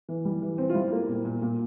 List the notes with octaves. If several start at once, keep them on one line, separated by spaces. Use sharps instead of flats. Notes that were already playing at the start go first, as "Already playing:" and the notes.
E3
G3
E3
C4
F4
G3 E4
A#3
A#2
A#2
A#2